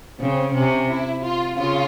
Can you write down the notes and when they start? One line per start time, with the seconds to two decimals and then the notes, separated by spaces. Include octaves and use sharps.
0.20 C#3 C4
0.54 C3 C#4
0.88 E4
1.23 F4
1.56 C#3 F4